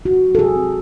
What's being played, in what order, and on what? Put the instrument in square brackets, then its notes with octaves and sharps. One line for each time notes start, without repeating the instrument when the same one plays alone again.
[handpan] C3 F#4
F#3
A4
C3 G#4
C4